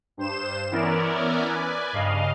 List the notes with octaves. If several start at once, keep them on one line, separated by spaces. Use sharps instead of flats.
G2 C5 E7
E3 B3 C#4 E4 A#4 D5
B4 D5 G#5
G2 C#3 D#5 F5